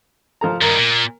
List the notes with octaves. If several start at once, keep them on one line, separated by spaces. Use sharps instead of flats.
F3 A4 A#5
G2 D#3 A#4
A#2